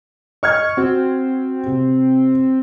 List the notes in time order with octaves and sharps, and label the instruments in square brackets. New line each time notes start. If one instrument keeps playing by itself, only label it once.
[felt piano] D#5 F6 G#6 [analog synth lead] C#6
[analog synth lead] C4 [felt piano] F#4
[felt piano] C3